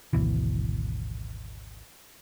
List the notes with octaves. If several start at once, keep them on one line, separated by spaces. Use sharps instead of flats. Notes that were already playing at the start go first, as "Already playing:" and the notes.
G#1 D2 B2 E3